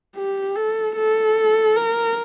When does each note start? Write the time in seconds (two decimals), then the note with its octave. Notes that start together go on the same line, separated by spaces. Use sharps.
0.16 G4
0.56 A4
0.96 A4
1.76 A#4